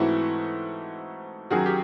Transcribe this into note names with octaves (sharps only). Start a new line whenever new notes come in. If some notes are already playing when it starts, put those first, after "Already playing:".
Already playing: G#2 E3 A3 C4 E4 F#4
F#2 D#3 F#3 F#4 G#4
G4